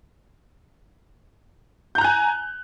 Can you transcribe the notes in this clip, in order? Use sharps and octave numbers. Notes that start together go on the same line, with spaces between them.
G#5 A#5 F#6 G6